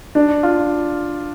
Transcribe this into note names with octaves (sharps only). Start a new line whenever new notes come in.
D4
F4